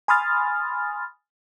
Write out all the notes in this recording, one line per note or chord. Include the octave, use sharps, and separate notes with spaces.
G#5 B5 C6 D#6 F6 A6